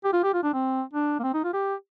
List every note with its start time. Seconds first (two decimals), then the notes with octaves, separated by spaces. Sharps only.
0.04 G4
0.13 F4
0.23 G4
0.34 F4
0.43 D4
0.54 C4
0.93 D4
1.19 A#3
1.23 C4
1.34 D#4
1.44 F4
1.53 G4